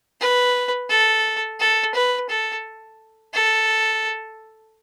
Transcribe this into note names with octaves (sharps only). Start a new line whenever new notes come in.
B4
A4
A4
B4
A4
A4